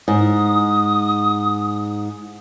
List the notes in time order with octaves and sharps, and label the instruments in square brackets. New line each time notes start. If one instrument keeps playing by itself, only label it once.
[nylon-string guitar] G#2 [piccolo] D#6